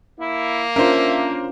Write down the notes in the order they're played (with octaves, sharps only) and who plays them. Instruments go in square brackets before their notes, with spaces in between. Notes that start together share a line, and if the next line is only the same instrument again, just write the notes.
[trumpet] A#3 [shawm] E4
[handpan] C#4 D4 F4 [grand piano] A#4 C5 [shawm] E5